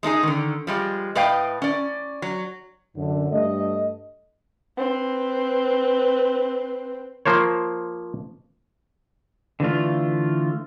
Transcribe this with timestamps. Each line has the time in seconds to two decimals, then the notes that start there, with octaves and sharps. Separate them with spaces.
0.03 G#3 D4 D#4 G#4
0.23 D3 D#3
0.67 F3 G3 G#3
1.15 A2 B4 D#5 F5 G5
1.62 C#4 D5
2.22 F#3
2.97 F#2 D3
3.32 G2 A3 D#5
4.78 C4 B4
7.26 F3 A#3 C5 C#5
9.60 D3 E3 A3 F4